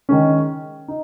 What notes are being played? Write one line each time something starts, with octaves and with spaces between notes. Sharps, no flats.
D#3 G#3 C#4
D#4